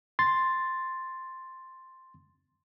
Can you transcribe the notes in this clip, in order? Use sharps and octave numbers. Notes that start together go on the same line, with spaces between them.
C6 A6